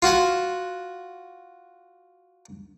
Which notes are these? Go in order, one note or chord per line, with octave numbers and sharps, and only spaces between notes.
F4 F#4 F#5 G#5